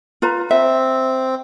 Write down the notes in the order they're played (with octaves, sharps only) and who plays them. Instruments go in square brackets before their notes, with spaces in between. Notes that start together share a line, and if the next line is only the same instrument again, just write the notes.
[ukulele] F4 B4 A#5
[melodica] C4 [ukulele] E5